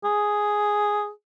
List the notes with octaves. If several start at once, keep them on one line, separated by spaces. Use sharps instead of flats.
G#4